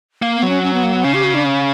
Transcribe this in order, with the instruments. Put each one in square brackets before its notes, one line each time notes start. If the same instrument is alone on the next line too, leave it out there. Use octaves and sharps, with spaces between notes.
[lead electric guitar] A#3
[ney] B3
[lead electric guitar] F#3
[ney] C#4
C#4
B3
A#3
B3
[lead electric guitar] C#3 [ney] C#4
[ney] G4
F#4
D4
C#4